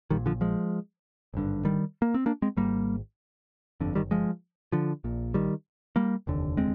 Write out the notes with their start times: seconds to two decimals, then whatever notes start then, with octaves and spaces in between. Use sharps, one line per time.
0.10 A#1 A#2 D#3 G3
0.26 D3 F3
0.41 F3 G#3
1.34 G#1 G2 D3
1.65 D#3 G3
2.02 A#3
2.14 C4
2.26 A#3 D4
2.42 G#3 C4
2.57 G#1 G#2 G3 A#3
3.81 G1 F2 D3
3.95 D#3 G3
4.11 F3 G#3
4.72 D3 F3
5.04 A#1 A#2
5.34 D#3 G3
5.96 G3 A#3
6.27 F1 D#2 D3
6.57 G#3 C4